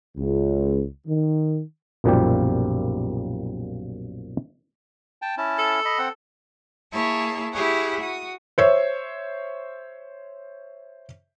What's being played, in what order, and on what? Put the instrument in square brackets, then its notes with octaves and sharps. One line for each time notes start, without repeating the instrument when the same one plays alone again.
[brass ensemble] C#2
D#3
[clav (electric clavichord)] B1 F#2 A#2 F3 G3 G4
[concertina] G5 A5
C#4 E4 A5
[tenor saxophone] A4
[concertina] D#5 B5
C4 F#5
[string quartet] A#3 E4 G#4 C#5 A5
E4 G4 G#4 C#5 F#5
F#4 D#6
[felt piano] C5 C#5 E5